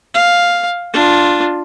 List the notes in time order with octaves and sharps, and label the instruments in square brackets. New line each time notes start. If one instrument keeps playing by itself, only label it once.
[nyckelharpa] F5
D4 F4